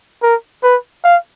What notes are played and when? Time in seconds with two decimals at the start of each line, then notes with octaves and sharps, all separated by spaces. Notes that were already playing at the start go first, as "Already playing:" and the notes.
0.22 A#4
0.63 B4
1.04 F5